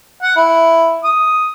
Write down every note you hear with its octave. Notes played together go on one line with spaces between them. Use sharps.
F#5
E4
D#6